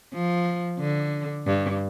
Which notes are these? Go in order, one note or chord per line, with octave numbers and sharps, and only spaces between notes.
F3
D3
G2